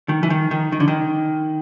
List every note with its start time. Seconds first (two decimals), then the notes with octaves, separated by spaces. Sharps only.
0.09 D#3
0.23 E3
0.30 D#3
0.51 D#3
0.72 D#3
0.80 D3
0.88 D#3